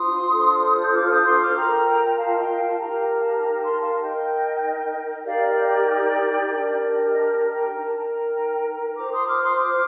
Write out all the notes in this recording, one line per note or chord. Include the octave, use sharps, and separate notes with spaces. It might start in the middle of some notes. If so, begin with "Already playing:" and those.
Already playing: D4 F4 C5 C6 D#6
D4 F4 A4 C5
G6
D6 F6
D#6 G6
C6 D#6
D6 F6
F4 A#4 G5 A#5
F5 A5
D#5 G5
F5 A5
D#4 G4 A#4 G5 A#5
G5 A#5
F5 A5
G5 A#5
A5 C6
F5 A5
D#4 A#4 D#5 G5
D#4 G4 A#4 D5 F5
D5
D5
D4 G4 A#4
D#5
G5 A#5
D#4 A#4 A#5
A5
G5 A#5
F4 C5 A#5 D6
C6 D#6
D6 F6
C6 D#6
D6 F6